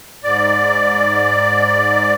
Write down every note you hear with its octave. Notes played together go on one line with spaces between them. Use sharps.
G#2 D5